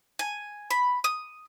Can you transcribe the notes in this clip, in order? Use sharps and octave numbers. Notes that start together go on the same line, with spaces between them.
G#5
B5
D#6